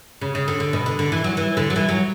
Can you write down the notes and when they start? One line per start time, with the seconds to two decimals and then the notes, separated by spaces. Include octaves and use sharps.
0.21 C#3
0.35 C#3
0.48 D3
0.60 D3
0.73 B2
0.86 D3
0.99 D3
1.12 E3
1.24 F#3
1.37 E3
1.57 D3
1.70 F#3
1.76 E3
1.89 F#3